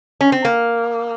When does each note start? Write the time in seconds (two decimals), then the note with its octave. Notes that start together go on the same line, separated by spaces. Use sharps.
0.21 C#4
0.32 C4
0.45 A#3